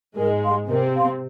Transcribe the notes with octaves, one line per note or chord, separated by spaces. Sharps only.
G#2 G#3 A#4
F5 C6
C3 C4 A#4
F5 C6